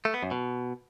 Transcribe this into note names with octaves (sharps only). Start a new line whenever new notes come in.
A3
B3
F#2
B2